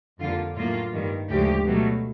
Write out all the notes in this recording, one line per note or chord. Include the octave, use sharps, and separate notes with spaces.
F2 D3 G3 A#3 F4
A2 F#3 A#3 F4
G2 D#3 G3
D2 C#3 F3 G#3 G4
B2 F#3 A3